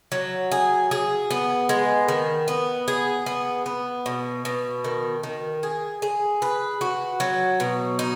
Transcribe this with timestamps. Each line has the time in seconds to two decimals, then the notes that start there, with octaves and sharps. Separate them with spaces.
0.12 F#3
0.52 G#4
0.91 G#4
1.31 B3
1.69 G#3
2.08 D#3
2.48 B3
2.88 G#4
3.26 B3
3.66 B3
4.06 B2
4.45 B2
4.84 D#3
5.23 D#3
5.63 G#4
6.02 G#4
6.42 B4
6.81 F#4
7.20 F#3
7.60 B2
7.99 D#4